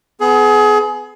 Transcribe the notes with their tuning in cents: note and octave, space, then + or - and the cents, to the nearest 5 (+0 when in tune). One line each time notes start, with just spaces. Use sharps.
B3 +25 G#4 +30